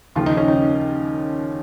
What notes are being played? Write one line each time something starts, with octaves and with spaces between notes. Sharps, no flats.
D#2 C#3 F3 F4
D#4
C#4
D#4